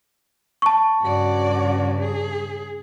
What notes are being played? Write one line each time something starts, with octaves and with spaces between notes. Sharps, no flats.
A5 C#6
G2 C#3 F#4 D5
G#4